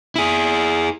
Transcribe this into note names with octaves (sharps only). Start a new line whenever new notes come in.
E4 G#4